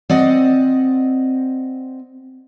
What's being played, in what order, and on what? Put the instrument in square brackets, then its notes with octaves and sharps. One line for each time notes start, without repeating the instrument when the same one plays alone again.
[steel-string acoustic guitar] C4 D5 D#5 F#5